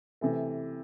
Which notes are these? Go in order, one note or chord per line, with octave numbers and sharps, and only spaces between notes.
C3 E3 A3